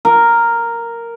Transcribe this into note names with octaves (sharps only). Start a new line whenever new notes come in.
A#4